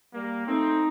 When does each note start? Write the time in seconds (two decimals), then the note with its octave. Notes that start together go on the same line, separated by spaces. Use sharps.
0.14 G3 A#3
0.47 A3 C4 D#4